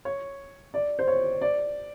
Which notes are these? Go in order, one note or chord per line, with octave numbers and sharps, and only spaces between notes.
C#5
D5
C5
C#5
D5